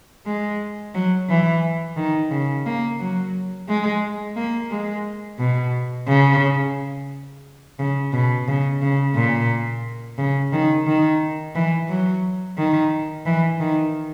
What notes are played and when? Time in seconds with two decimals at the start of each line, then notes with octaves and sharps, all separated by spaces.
0.26 G#3
0.95 F#3
1.29 E3
1.97 D#3
2.31 C#3
2.66 A#3
3.00 F#3
3.69 G#3
4.36 A#3
4.71 G#3
5.39 B2
6.08 C#3
7.79 C#3
8.13 B2
8.48 C#3
8.82 C#3
9.15 A#2
10.18 C#3
10.53 D#3
10.87 D#3
11.55 E3
11.89 F#3
12.58 D#3
13.26 E3
13.61 D#3